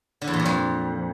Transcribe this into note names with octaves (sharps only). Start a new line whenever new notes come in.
D3
E2
A#2
G2
F2